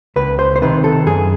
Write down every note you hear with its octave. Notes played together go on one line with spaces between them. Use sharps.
C#2 B4
C5
C5
C3 D#3 B4
A4
F#2 G#4